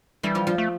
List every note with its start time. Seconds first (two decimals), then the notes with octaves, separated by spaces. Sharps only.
0.23 E3 G3 E4
0.35 F3 F4
0.47 F3 F4
0.58 A3